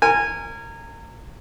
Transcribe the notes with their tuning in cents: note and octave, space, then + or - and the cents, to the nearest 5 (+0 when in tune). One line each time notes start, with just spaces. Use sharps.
A#4 -30 G#5 -15